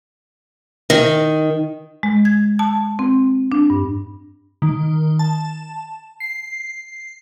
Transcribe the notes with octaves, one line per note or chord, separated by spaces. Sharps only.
D#3
G#3
G#6
A5
C4
D4
G2
D#3
A5
C7